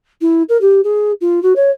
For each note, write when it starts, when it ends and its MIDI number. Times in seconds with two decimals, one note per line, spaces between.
0.21 0.43 64
0.49 0.59 70
0.61 0.80 67
0.84 1.12 68
1.21 1.42 65
1.42 1.53 66
1.56 1.70 73